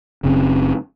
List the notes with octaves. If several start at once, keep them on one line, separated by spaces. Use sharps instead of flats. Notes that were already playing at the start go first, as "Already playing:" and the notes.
F#1 F#2 C#3 C4